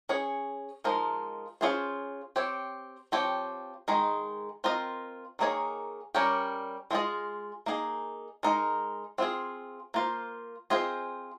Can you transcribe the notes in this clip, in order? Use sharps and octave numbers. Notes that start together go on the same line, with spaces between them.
C#4 G#4 C#5
F3 G#3 D#4 A#4
C#4 F4 G#4 C5
C4 G4 C#5
F3 C4 G4 C#5
D#3 G#3 D#4 G#4
C4 F4 A#4 D#5
D#3 A#3 D#4 G#4 C#5
G3 C#4 G4 A#4 C#5
G#3 C4 F4 G#4 D#5
A#3 D#4 G#4
G#3 D#4 A#4
C4 F4 G#4
A#3 F4 C5
C4 F4 G#4 C5 D#5